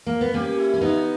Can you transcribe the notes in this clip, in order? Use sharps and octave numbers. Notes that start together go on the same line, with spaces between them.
A#3
B3
A#3 C#4 G4
E4
C#4
B3 D#4 E4